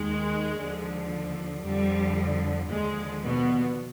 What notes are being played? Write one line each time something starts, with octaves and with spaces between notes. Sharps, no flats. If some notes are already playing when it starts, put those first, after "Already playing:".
Already playing: D#2 D#3 G#3
D#2 D3 F3
F2 D3 F3 G3
D#2 D3 F3 G#3
B2 B3